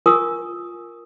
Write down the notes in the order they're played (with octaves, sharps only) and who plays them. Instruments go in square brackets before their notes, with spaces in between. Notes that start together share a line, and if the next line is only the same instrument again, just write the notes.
[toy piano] F4 A#4 G#5 C#6 D#6